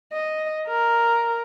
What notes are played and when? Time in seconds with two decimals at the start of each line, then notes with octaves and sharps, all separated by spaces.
0.13 D#5
0.67 A#4